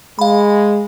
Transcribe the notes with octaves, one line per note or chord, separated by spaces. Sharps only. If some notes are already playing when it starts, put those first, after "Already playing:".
G#3 F5 B5